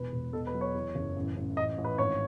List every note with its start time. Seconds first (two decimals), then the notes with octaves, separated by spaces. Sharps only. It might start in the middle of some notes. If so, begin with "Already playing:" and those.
Already playing: E1 E2 B4
0.13 E1
0.33 B2 A4
0.47 B4
0.54 F#3
0.61 C#5
0.74 E2
0.95 F#1
1.16 A1
1.36 A1
1.57 A1 D#5
1.78 A1
1.84 B4
1.98 G#1 C#5